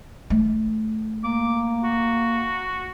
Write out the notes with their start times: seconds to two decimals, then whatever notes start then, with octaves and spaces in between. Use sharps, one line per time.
0.30 A3
1.24 A#3 D6
1.84 F#4